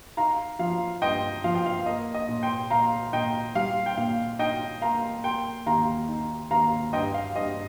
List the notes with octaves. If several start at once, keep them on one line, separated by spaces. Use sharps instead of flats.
D#4 F5 A#5
F3 F5
G2 D#5 G5
F3 F5
G5
F5
A#3 D#5
D#5
A#2
G5 C6
A#2 F5 A#5
A#2 D#5 G5
G3 F5
G5
A#2 F5
D#4 D#5 G5
A#3 F5 A#5
A#3 G5 C6
D#2 F5 A#5
D#4
D#2 F5 A#5
G2 D#5 G5
F5
G2 D#5